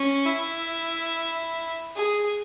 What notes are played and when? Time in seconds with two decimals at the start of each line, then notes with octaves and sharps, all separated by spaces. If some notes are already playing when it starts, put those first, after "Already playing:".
Already playing: C#4
0.26 E4
1.96 G#4